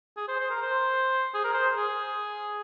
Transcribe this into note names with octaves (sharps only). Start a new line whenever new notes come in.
G#4
C5
C5
A#4
C5
G#4
A#4
C5
G#4